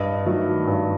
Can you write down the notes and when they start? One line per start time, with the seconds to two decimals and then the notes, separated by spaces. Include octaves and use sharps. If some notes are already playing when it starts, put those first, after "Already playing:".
Already playing: G2 D#5
0.25 D#3 F#3 A3
0.67 G2